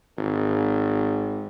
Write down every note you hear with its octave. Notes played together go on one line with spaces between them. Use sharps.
G#1